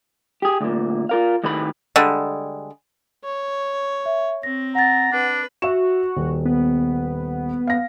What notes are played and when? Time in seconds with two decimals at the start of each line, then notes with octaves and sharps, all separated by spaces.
0.42 G4 G#4
0.61 D2 A#2
1.09 F4 A#4 F5
1.44 A2 D#3 F#4 G#4 B4 B5
1.96 D3 G3 G#3
3.24 C#5
4.06 E5
4.43 C4 A#6
4.75 F#5 A#5 A6
5.12 D4 B4
5.62 F#4 E5 E7
6.17 D#1
6.45 B3
7.67 F5 A#6